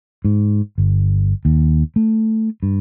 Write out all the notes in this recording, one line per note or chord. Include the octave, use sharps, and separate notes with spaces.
G#2
G1
D#2
A3
G2